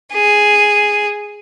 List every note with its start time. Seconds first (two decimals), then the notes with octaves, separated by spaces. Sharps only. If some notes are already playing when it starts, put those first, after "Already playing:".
0.13 G#4